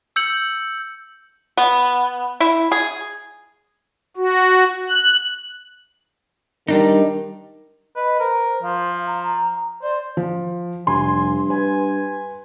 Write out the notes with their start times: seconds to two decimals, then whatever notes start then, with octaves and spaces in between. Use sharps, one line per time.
0.16 E6 G6 C#7 F#7
1.57 B3
2.40 E4
2.72 G#4
4.17 F#4
4.90 F#6
6.68 D#3 G3 D4 D#4
7.96 B4 D#5
8.20 A#4 C5
8.63 F3 F5
9.07 A#5
9.83 C5 D5
10.17 F3
10.87 F1 G2 G#5 C6
11.50 B4 G#5